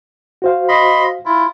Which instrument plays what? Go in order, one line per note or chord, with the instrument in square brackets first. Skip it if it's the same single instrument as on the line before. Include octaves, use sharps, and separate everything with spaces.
[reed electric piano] F#4 C5 F5
[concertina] D#5 B5 C6
E4 F4